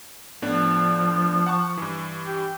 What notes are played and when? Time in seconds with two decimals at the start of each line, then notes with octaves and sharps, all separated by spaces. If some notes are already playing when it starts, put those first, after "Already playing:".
0.42 A2 F3 B3 D4
1.46 F#5 A5 C#6
1.77 G2 E3
2.27 G4